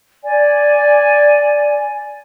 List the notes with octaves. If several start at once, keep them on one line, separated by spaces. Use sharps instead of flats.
D5 G#5